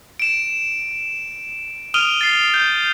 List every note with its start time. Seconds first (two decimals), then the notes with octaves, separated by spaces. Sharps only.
0.20 D7 E7
1.94 D#6 F6 D7 D#7 F7 G7
2.21 A6 C7
2.54 G6